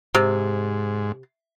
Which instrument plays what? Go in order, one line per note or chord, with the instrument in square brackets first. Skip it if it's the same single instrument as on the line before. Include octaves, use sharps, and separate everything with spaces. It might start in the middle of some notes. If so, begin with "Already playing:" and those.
[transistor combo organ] G#2 [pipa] C3